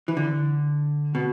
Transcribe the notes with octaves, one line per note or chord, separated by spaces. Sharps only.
E3
D3
B2